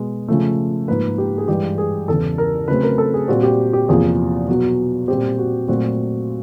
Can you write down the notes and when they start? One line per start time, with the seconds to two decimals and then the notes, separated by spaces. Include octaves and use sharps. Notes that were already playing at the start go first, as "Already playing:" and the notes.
Already playing: B2 G#3 B3
0.28 C#3 F3 A3
0.88 G#2 F3 A#3 B4
1.18 G4
1.38 G#4
1.48 G2 E3 G#3 G4
1.78 G#4
2.08 E2 C#3 E3 A4
2.38 A#4
2.68 C#3 F#3 A3 C4 B4
2.83 A#4
2.98 A4
3.14 G#4
3.28 A#2 G3 C4 F#4
3.43 G4
3.73 G4
3.88 E2 C3 F3 A#3 G#4
4.48 B2 F#3 B3 F#4
5.08 A#2 G3 C4 G4
5.38 F#4
5.68 A#2 F#3 A3 C4 F#4